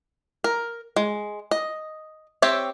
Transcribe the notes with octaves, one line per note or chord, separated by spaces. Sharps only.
A#4
G#3
D#5
C4 G4 C#5 E5